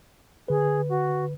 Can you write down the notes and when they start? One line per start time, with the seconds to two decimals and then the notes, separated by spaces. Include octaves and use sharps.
0.48 D3 G#4 B4
0.89 F#4